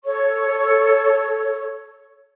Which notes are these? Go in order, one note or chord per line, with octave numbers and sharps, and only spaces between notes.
A4 C#5 C#6